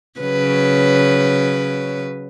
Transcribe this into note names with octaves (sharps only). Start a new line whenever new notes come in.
C#3 F#3 B4